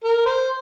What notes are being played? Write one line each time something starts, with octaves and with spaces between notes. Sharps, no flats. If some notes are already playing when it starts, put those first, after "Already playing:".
A#4
C5